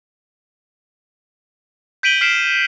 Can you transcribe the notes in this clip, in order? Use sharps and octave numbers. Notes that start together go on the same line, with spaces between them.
G6 B6 D7 D#7 F#7 G7
F6 B6 C7 D7 E7